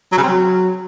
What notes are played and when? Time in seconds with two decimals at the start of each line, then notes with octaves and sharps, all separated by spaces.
0.12 F#3
0.18 C#3
0.23 C4
0.28 F#3